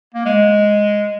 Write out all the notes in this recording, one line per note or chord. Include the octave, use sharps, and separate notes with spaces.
A#3
G#3